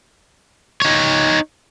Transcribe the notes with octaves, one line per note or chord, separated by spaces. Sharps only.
D#4 C#5